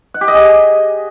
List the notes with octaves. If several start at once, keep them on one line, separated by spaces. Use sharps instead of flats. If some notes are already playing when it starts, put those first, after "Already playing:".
F#5
G4
D#5
G#4